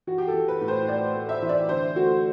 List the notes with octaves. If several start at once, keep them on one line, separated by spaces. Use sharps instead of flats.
E3 F#4
G4
A4
E3
B4
A2
C5
A2 D5
A3
E5
E3
D5
D3 C5
A3 F#4